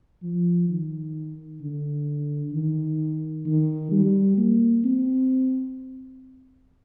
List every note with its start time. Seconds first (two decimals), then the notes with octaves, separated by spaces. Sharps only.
0.23 F3
0.68 D#3
1.61 D3
2.53 D#3
3.46 D#3
3.92 G3
4.37 A#3
4.84 C4